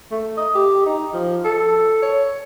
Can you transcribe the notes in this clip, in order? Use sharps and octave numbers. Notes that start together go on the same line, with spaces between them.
A3
D#5
G4
D#4
F3
A4
C#5